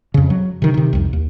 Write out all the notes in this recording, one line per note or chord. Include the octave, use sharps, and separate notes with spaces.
F2 C#3
F#3
C3 D#3
C3 D#3
C2 F2
D#2